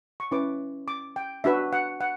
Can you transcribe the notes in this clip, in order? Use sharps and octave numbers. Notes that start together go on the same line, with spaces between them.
C#6
C#4 E4 B4 D6
D6
G5
D4 F#4 B4 E5
F#5
F#5